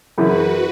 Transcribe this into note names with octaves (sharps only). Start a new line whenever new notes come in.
F#2 C#3 E3 F#4 B4